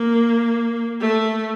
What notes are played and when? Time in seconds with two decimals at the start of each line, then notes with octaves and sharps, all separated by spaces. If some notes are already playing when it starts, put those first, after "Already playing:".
Already playing: A#3
1.01 A3